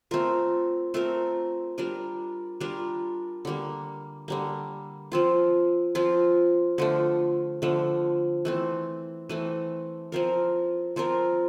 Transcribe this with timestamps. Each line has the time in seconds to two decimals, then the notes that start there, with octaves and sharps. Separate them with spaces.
0.11 A3 C4 F4 A#4
0.94 A3 C4 F4 A#4
1.78 G3 D4 F4 A#4
2.61 G3 D4 F4 A#4
3.45 D3 G3 A#3
4.28 D3 G3 A#3
5.12 F3 C4 F4
5.95 F3 C4 F4
6.78 D3 F3 A3
7.62 D3 F3 A3
8.45 E3 A3 C4
9.29 E3 A3 C4
10.12 F3 C4 F4 A#4
10.96 F3 C4 F4 A#4